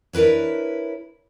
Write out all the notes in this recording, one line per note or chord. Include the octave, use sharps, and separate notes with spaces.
D4 E4 A#4 B4 C#5